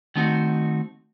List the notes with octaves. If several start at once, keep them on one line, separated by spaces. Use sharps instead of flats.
D#3 A3 C4 D#4 F#4